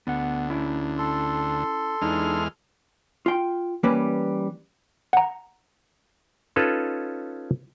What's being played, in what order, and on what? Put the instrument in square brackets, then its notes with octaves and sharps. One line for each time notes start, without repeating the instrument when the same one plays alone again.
[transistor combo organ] D2 [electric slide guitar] B3 F#5
[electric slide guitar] C#4 E4
[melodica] A4 C6
[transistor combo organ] E2 G#3 F6 [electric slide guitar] D4 D#4
[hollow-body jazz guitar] F4 G5
E3 G3 A#3 C#4 B4
[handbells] F#5 A#5
[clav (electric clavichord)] C#4 D#4 F4 A4 B4 C#5